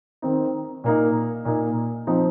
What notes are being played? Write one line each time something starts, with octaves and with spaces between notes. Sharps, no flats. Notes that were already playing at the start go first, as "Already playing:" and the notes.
D#3 C4 D#4
A#2 A#3 D#4
A#2 A#3 D#4
F3 C4 D#4